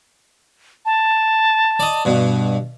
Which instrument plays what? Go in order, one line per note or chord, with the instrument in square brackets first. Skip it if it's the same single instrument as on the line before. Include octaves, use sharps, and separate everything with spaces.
[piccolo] A5
[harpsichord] D5 D#5
G2 B2